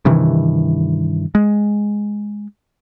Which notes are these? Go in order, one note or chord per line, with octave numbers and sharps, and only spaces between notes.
G2 C3 D#3 E3
G#3